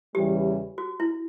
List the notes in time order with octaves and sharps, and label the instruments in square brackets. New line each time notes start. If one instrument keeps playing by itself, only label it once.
[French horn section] E2 C#3 E3 G3 [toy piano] G4
[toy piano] F#4
E4